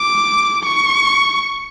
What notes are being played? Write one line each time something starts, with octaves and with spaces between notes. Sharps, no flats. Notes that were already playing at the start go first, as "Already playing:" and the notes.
Already playing: D6
C#6